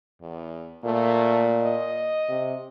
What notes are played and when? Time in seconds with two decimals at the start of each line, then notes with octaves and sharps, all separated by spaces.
0.22 E2
0.84 A#2 A3
1.62 D#5
2.29 C3